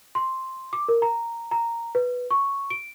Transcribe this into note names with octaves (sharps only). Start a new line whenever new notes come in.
C6
D6
A#4
A#5
A#5
B4
C#6
D7